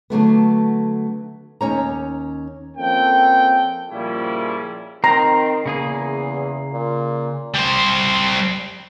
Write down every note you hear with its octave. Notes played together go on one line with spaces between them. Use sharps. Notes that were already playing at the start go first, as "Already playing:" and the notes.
D3 F#3 A3 B3
D#2 C#4 C#5 A#5
F2 A#3 C#4 A4 G5
A#2 C#3 F3 G3 C#4 E4
D#3 C4 A#5
E2 C#3 A#3 G#4
A#2
G3 C5